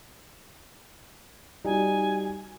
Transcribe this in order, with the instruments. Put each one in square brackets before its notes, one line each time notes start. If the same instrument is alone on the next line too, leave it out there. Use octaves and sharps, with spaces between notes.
[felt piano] G3 D#4 F#4 [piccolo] G#5